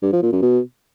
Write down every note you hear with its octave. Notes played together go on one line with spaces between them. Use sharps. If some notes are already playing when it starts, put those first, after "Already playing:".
G2
F3
A#2
F#2
B2